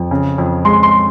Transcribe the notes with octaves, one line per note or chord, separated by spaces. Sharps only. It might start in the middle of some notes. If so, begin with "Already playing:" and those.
Already playing: F2
C#3
F2
G#3 C6
C6